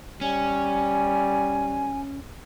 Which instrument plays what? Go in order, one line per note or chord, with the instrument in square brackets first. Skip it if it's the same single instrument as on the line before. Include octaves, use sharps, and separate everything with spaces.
[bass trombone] G3 [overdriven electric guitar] C#4 [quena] G#5